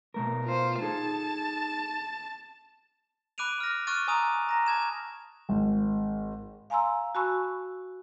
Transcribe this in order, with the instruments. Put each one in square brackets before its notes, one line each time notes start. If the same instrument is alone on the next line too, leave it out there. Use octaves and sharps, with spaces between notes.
[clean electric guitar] B2 A3 A#4
[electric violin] F4 C5
[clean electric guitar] D#4 G#4 A4 [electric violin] A5
[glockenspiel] B5 D6 F#6 D7 D#7 F7
F6 A#6
C#6 D6 F6 F#6 A6 D#7
G#5 A#5 D#6 E6 D#7 F7
A#5 A#6
A5 D6 G#6 E7
[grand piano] G#1
[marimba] F5 G#5 A#5 C6 E6
F#4 G#5 A5 B5 C#6 E6